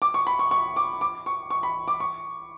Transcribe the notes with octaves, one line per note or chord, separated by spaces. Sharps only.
D6
C#6
B5
C#6
C#6
D6
D6
C#6
C#6
B5
D6
C#6